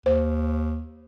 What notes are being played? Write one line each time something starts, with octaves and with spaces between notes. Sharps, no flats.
D#2 C5